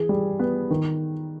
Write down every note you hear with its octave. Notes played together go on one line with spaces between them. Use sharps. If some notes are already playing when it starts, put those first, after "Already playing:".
Already playing: E3 G#4
G3
B3
D#3